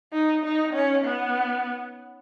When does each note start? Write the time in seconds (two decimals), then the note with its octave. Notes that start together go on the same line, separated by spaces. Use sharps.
0.13 D#4
0.44 D#4
0.74 C#4
1.04 B3